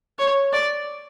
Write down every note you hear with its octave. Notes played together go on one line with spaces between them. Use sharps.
C#5
D5